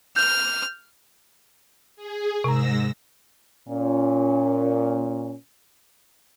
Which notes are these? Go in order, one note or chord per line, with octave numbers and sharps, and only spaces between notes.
F6 G6
G#4
G#2 C3 A#5 E6 A#6
A#2 C#4